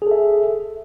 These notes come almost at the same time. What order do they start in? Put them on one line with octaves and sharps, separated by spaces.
G#4 A4 E5